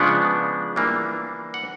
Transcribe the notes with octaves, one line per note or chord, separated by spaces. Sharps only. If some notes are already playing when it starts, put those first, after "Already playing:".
Already playing: C#3 F3 G#3 B3 D4 F#5
E3 G3 A#3 D4
F#5